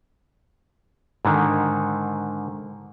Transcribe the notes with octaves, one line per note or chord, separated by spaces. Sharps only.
G#2 D3 D#3